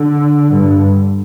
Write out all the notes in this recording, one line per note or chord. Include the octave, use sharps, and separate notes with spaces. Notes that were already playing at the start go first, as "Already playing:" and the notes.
Already playing: D3
G2